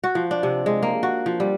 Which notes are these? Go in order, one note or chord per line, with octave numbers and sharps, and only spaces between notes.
F#4
F3
D4
C3
G#3
A#3
F#4
F3
G3